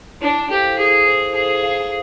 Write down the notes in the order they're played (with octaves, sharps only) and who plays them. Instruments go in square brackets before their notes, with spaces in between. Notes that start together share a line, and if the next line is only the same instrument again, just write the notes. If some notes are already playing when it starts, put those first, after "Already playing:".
[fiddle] D4 [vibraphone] E4
[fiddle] G4 [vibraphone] A4 C5 F5
[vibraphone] E4 [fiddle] G#4
[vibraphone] A4 C5 F5
[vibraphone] E4 [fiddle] G#4
[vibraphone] A4 C5 F5